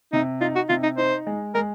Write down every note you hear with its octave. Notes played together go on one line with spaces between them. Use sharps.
C3 D#4
D#4 F4
F#4
C3 F4
D#4
D#4 C5
G#3
G#3 A#4